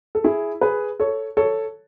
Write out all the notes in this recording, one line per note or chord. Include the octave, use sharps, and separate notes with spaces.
A4
E4 G#4
G#4 B4
A4 C#5
A4 C#5